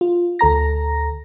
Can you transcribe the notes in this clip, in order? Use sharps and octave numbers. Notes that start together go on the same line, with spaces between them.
F4
D2 A4 A#5 A#6